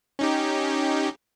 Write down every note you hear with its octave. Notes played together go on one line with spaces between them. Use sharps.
C#4 D#4 G4